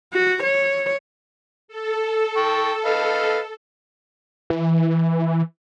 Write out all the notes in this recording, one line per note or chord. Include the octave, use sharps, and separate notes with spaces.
F#4
C#5
A4
G5 C#6
B4 D#5 F5
E3